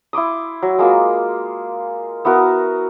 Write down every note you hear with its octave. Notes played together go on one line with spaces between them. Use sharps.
E4 C6 D6 D#6
F#3
G#3 A#3 F4
B3 E4 F#4 A#4